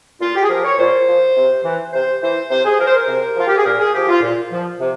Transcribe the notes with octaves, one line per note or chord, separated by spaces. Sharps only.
A#2 F4
G4
G#4
F3 A#4
C#5
A#2 C5
F3
C3
E3
C3 C5
E3 C5
C3 C5
G#4
F3 A#4
C5
A#4
C3
F3 F4
G4
G#4
A#2 A#4
G#4
F3 G4
F4
A#2
F3
C3